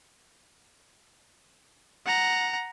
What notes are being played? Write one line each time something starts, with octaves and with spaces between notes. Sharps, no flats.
F#5 A#5